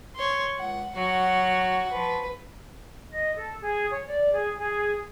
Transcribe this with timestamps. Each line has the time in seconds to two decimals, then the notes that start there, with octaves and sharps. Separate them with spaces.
0.16 C#5 C6
0.58 C#2 F#5
0.96 F#3 F#4 F#5
1.92 F3 B4
3.11 D#5
3.36 A4
3.61 G#4
3.91 C#5
4.07 D5
4.33 G#4
4.58 G#4